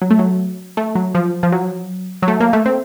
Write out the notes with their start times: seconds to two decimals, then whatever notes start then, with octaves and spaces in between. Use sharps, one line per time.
0.02 F#3
0.10 A3
0.19 F#3
0.77 A3
0.95 F#3
1.15 F3
1.43 F3
1.52 F#3
2.22 F#3
2.28 A3
2.40 A#3
2.53 A3
2.66 C4